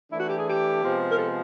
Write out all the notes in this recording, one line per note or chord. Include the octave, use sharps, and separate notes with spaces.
E3 A3 D4 E4
F#4
G4
G#4
G4
C3 F3 G#3 B3
A#4
A4